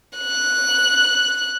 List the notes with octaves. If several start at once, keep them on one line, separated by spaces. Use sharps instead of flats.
F#6